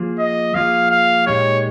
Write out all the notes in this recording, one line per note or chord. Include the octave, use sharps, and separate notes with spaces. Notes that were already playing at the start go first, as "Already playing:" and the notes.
Already playing: F3 A#3 F4 G#4
D#5
F3 A#3 F4 G#4 F5
F5
A#2 G#3 D#4 G4 C#5